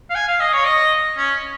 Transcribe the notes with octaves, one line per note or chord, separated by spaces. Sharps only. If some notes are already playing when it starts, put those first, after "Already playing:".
F5
G#5
F5
D#5
C#5
D#5
C#4